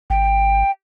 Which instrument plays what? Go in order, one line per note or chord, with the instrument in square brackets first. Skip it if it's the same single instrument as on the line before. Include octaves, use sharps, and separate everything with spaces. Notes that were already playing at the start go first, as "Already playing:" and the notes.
[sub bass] G#1 [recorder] G5